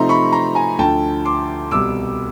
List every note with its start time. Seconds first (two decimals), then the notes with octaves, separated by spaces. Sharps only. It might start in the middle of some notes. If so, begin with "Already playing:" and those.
Already playing: C3 F3 A3 C4 D#4 A#5 C6
0.09 B5 C#6
0.32 A#5 C6
0.55 G#5 A#5
0.78 D2 D3 F3 G5 A5
1.25 C6 D6
1.71 C2 B2 G3 D6 E6